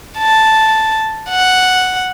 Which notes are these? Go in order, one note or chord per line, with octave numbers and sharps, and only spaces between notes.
A5
F#5